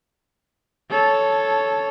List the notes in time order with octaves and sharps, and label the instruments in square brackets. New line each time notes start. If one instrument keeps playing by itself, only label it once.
[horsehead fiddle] A4 C#5